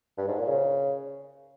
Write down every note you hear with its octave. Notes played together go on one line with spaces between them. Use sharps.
G2
G#2
A#2
C#3